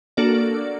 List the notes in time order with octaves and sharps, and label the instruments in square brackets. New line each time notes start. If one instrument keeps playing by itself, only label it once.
[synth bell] A#3 D4 F#4 A4 D5